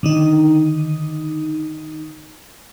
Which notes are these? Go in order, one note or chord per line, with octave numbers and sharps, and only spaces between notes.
D3 D#3 D#4